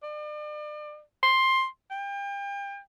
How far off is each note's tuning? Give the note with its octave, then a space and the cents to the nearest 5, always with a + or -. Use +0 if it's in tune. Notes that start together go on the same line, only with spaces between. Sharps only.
D5 +40
C6 +10
G5 +35